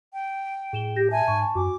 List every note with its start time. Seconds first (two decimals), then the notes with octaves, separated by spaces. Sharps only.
0.13 G5
0.73 A2 G#4 E7 G7
0.96 G4 G6 A#6
1.11 E5 G#5 A5
1.28 G#2 C#6
1.55 F#2 F#4 G#5 D6